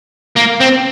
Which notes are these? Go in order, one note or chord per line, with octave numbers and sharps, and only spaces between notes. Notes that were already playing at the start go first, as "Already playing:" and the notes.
A#3
C4